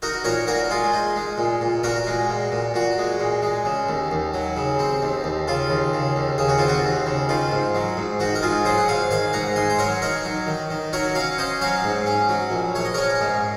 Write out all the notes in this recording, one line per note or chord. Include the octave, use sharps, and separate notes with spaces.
D#4 F#4 A#4
A#2 A#4 C#5
A#2 F#4 A#4
G#3 F4 G#4
D#4
G#3
A#2
A#2
A#2 F#4 A#4
G#3
A#2
A#2
A#2 F#4
G#3
A#2
G#3
C#3
D#2
D#2
F#3
C#3
C4
D#2
D#2
C#3 F4
D#2
C#3
D#2
C#3 G#4
F#4
C4 F4
F#4
D#2
C#3
D#3 F4
G#2
F#3
G#2
D#3 F#4
A#4
G#2 F4 G#4
F#3 G#4 C5
F#5
G#2 F5 G#5
D#3 F5 G#5
G#2 F#5 A#5
G#2 G#5 C6
C5
F#3 A#4 C#5
D#3 A#4 C#5
F#3
D#3
D#3
F#3 A#4 C#5
C#4 C#5 F5
C#4 C5 D#5
F#3 C#5 F5
G#2
C#4
F#3
A#1
A#1 C#5
D#5
C#4 A#4 C#5
G#2